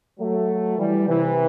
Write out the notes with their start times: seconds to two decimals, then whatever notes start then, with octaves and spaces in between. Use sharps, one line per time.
0.20 F#3 A3
0.79 E3 G3
1.07 C3 E3